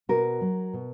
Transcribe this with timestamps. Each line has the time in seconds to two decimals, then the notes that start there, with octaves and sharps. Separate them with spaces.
0.09 B2 F#4 A#4
0.41 F#3
0.73 B2